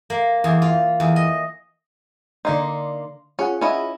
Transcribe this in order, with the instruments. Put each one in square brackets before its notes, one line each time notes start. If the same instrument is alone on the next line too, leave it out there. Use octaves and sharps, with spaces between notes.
[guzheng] A#3
E2
F4
E2
D#5
[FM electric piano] D3 D5 C6 [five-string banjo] A#3 D#4
[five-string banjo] C#4 [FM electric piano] F4 G#4 F#5
[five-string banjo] C#4 E4 D#5